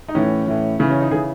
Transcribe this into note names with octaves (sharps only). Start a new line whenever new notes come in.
D#4
A2 E3 C#4
A2 E3
C#3 E3 C#4
C#4
D#4
C#3 E3 G#4